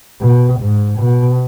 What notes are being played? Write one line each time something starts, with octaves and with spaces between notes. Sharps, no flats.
B2
G#2
B2